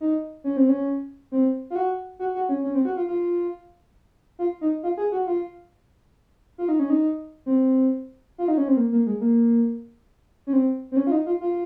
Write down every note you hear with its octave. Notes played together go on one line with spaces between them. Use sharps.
D#4
C#4
C4
C#4
C4
F4
F#4
F#4
F#4
C#4
C#4
C4
F#4
F4
F4
F4
D#4
F4
G#4
F#4
F4
F4
D#4
C#4
D#4
C4
F4
D#4
C#4
C4
A#3
A#3
G#3
A#3
C#4
C4
C4
C#4
F4
D#4
F4
F4